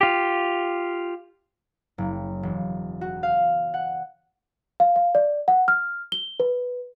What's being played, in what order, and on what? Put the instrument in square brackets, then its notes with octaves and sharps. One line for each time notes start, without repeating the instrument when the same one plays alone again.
[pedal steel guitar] F4 G4
[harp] F#1
E1
F#4
F5
F#5
[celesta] F5
F5
D5
F#5
F6
G7
B4